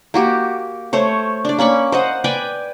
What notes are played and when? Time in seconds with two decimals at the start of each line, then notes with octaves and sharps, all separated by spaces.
0.14 A#3 F#4 G4
0.93 A3 C5 C#5
1.45 D4 D5
1.59 A#3 C#4 B5 C#6
1.92 C5 D#5 F#5
2.24 B4 D5 G5 G#5